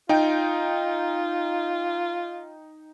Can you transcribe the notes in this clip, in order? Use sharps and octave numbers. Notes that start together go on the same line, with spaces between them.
D#4 F4 G5